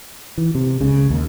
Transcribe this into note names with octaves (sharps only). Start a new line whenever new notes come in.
E3
C3
C#2 C#3
D#2